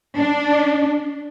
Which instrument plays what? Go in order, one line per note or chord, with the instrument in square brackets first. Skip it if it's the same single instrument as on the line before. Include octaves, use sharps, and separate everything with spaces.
[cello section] D4